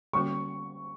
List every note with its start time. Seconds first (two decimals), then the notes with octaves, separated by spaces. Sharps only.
0.13 D3 G3 A#3 C#4 F#4 C#6